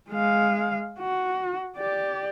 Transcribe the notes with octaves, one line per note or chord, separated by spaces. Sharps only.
G#3 F5
F#4
G4 D5